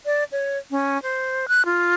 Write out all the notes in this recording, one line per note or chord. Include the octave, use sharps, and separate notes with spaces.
D5
C#5
C#4
C5
F#6
F4